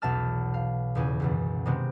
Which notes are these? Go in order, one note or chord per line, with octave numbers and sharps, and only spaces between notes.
B1 E2 B2 E5 A5 F6
F5
D#1 E2 C#3 G#5
C#2 F#2 B2
C3 D#3 G#3 B3 C4